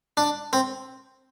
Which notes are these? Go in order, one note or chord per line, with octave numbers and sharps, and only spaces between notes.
D4
C4